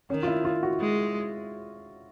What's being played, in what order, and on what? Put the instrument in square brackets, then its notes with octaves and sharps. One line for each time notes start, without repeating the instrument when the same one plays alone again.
[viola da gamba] D#3 [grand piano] C#4
[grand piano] F4
E4
F4
F#4
[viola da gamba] G#3